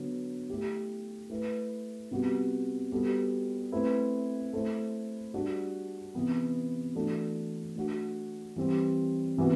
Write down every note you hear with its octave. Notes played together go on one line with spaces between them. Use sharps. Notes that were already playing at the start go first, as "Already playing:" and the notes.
Already playing: D3 F#3 B3
A3 E4 G4
A3 E4 B4
C3 G3 B3 F#4
G3 B3 F#4 A4
A3 C4 E4 B4
A3 E4 A4 C5
G3 D4 F#4
C3 E3 B3
E3 A3 D4 F#4 A4
A3 D4 F#4
E3 G3 C4
C3 E3 B3 F#4